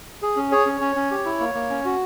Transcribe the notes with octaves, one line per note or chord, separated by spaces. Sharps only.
G#4
C#4
G#4 C#5
C#4
C#4
C#4
G4
E4
A#3
A#3
C#4
F#4